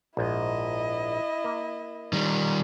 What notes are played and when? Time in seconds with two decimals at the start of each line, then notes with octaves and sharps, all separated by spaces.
0.17 A#1 G#2 E4 D#5
1.44 A#3
2.13 D#3 G3